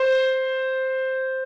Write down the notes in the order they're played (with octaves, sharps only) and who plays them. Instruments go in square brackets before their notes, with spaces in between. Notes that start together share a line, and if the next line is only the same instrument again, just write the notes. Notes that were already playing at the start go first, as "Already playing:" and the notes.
Already playing: [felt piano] C5